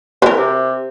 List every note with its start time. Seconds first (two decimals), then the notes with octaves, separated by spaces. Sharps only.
0.22 E3 A#4 B4
0.38 C3